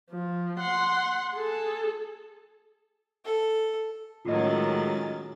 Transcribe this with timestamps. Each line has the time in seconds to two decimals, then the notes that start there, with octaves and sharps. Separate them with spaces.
0.11 F3
0.59 F#5 C6
1.34 G#4 A4
3.25 A4
4.25 A2 D#3 F#3 G#3 C#4 F4 D#5 A6